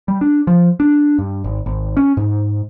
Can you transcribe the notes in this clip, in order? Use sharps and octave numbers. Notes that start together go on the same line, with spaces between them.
G3
D4
F3
D4
G2
G#1
G#1
C#4
G#2